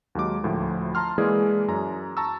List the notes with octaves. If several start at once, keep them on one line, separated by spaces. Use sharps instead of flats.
D#2 F#3 G#3 D6
D2 A2 F3
A5 A#5 C6 F6
E3 G#3 A#3 E4 G#4 D5
F#2 A#5
A5 A#5 C#6 E6